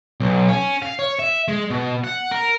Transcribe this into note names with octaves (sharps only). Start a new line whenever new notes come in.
B1
C#4
F5
C#5
E5
G#3
B2
F#5
A#4